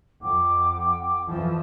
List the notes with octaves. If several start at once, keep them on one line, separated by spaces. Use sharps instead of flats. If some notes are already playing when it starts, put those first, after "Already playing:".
F2 F#5 G5 D6
F2 E3 F3 A5